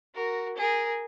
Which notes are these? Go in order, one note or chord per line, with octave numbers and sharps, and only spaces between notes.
F#4 A#4
G#4 A#4